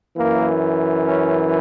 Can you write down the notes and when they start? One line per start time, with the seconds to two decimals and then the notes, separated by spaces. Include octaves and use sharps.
0.17 F#2 E3 A#3
1.06 C#4